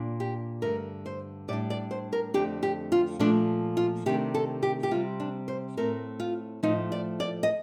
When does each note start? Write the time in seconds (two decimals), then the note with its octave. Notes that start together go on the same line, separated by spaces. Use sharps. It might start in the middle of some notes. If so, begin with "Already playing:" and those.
Already playing: A#2 D4
0.20 G4
0.62 G2 D3 A3 A#4
1.06 C5
1.48 A2 G3 D4 D5
1.70 D5
1.91 C5
2.13 A#4
2.34 F2 D3 A3 D4 G4
2.63 G4
2.92 F4
3.19 A#2 F3 A3 D4
3.77 F4
4.06 C3 D#3 A3 D4 G4
4.34 A4
4.63 G4
4.83 G4
4.91 C3 G3 C4 F4
5.20 D4
5.48 C5
5.77 A2 A3 C4 A#4
6.20 F4
6.63 A2 F3 A3 D#4
6.92 D5
7.20 D5
7.43 D#5